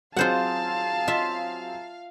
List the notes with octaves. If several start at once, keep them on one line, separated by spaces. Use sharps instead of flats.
F#3 C4 F4 G#4 C5 F5 F#5 A5
F4 E5